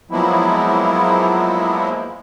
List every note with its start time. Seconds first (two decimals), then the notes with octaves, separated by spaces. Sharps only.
0.11 F3 F#3 G#3 A#3 B3 E4